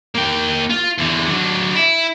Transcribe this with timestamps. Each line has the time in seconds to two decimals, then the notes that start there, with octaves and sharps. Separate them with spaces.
0.15 A#3 G5
0.70 F4
0.98 E2 D3
1.27 F#3 D4
1.75 E4